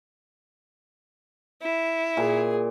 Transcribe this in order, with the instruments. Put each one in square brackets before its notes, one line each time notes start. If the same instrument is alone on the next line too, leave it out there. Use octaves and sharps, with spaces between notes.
[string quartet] E4
[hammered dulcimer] A#2 [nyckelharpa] G#4